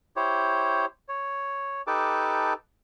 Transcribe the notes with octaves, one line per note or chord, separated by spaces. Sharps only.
E4 G4 C5 C#5
C#5
D#4 G4 A4 B4 A5 D6